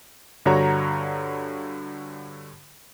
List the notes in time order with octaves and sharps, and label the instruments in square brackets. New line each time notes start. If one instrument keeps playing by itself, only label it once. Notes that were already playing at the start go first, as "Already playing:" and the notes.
[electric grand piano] G2 D3 F#4 C#5 F#5 A#5